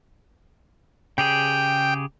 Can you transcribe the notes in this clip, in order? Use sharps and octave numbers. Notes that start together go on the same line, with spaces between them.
C#3 G4 G#4 G5